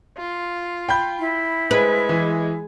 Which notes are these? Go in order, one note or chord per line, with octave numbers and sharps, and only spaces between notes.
F4
G5 B5 G6
E4
G#3 B4
E3